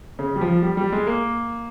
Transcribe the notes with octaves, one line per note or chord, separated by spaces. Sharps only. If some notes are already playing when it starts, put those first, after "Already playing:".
C#3
G3
F3
G3
G3
G#3
A#3